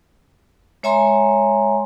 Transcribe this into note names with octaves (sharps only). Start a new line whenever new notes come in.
G#3 C#5 E5 G#5 A#5 C6